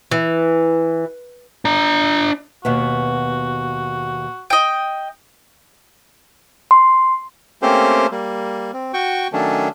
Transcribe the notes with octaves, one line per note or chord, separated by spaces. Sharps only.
E3
D4 A#5
D#2 B2 B3 F#4
D#5 G5
C6
A3 A#3 C4 C#4 G4 C5
G3 A#3
C4
F#4 G5 C#6
D#3 F#3 A3 C#4 D4